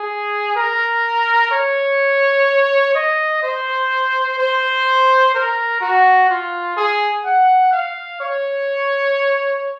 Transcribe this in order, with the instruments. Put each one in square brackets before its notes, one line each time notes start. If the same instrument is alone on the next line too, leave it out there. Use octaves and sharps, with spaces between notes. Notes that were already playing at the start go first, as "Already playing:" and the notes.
Already playing: [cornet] G#4
A#4
C#5
D#5
C5
C5
A#4
F#4
F4
G#4
F#5
F5
C#5